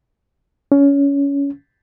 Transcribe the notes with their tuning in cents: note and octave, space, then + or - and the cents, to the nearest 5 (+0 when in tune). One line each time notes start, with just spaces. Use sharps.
C#4 +20